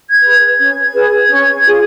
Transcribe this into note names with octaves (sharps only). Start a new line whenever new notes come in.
G#6
G#4 B4
G#6
C#4
G#4 B4
C#4
F4 G#4